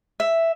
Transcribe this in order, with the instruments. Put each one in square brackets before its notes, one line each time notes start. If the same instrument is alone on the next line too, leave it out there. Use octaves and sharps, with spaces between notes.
[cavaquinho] E5